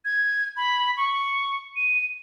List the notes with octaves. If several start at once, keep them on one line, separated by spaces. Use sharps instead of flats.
G#6
B5
C#6
D#7